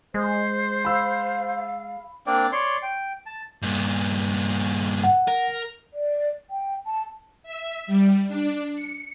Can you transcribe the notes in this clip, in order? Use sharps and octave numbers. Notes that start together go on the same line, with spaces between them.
G#3 C5
F5 B5 E6
A#3 C4 D4 D5
C#5 D5 C6
G5
A5
G2 A#2
F#5
A#4
D5
G5
A5
E5
G3
D4
C#7